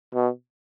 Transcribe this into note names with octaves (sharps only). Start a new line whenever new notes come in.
B2